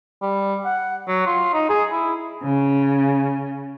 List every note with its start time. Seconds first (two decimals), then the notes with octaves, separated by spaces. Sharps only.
0.22 G3
0.65 F#5
1.07 F#3
1.26 F4
1.53 D#4
1.69 G#4
1.92 E4
2.44 C#3